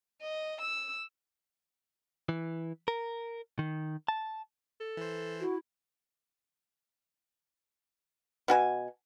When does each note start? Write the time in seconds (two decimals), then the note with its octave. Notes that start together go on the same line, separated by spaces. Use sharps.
0.21 D#5
0.61 E6
2.29 E3
2.88 A#4
3.59 D#3
4.08 A5
4.80 A4
4.97 E3 C5
5.41 E4 F#4
8.48 B2 F#4 G#5